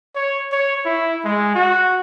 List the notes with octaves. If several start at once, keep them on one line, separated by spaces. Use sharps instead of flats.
C#5
C#5
E4
G#3
F#4